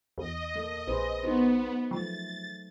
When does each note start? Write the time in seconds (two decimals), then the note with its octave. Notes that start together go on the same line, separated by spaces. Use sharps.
0.18 E2 D#5
0.55 A#3 A4
0.87 A#1 G#4 B4 C5
1.23 B3 D#4 F#4 C5
1.91 F3 F#3 A3 A6